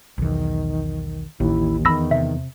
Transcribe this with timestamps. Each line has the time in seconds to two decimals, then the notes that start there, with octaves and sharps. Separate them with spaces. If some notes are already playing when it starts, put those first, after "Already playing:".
0.18 B1 E2 D#3
1.40 A1 D#2 E4
1.85 E2 D#3 B5 E6 A#6
2.11 C3 E5